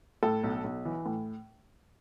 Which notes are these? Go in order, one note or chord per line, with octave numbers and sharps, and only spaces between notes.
A2 A4
B1
B1
E3
A2